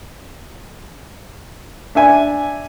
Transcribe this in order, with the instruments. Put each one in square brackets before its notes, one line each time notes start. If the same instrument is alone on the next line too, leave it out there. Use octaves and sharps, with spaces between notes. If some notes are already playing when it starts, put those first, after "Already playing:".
[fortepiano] D4 E5 G#5